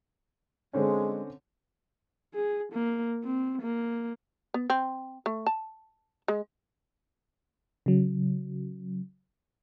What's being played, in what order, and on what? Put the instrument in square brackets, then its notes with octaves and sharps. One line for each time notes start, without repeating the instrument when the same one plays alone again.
[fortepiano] D3 C4 C#4 [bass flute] G#3
[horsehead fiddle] G#4
A#3
C4
A#3
[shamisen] B3
C4
A3
A5
G#3
[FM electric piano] C#3 F#3